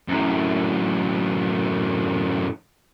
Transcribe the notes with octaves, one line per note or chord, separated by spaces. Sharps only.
F#2 A2